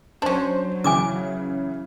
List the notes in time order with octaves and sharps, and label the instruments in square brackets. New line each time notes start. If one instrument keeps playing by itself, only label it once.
[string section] F#3 [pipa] C#4 D4 [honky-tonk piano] C5
[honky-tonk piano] C#3 E3 [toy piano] G#5 D6 D#6